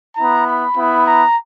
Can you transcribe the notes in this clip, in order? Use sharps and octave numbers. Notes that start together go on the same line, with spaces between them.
B3 E4 A#5
B5
B3 E4
A#5